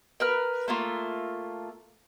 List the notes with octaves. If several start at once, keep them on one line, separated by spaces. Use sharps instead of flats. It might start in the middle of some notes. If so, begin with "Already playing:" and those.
A#4 B4 F6
A3 A#3 F4